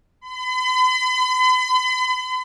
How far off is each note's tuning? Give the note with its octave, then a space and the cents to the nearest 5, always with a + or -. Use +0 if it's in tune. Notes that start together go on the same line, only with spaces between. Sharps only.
B5 +45